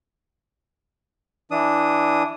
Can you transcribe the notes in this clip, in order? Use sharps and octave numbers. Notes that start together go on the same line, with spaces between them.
E3 D4 D#6